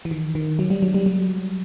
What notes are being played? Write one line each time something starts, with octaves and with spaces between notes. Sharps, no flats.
E3
D#3
D#3
F#3
G3
F#3
G3
F#3